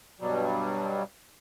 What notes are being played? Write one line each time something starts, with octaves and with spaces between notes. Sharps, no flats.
G2 B2 F#3 G3